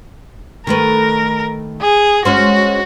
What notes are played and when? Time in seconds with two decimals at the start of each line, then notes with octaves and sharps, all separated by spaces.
0.67 D#3 A3 A#4 B4
1.81 G#4
2.25 G#3 C#4 F#4 C5